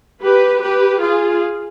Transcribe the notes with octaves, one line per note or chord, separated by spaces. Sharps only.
G4 B4
G4 B4
F4 G#4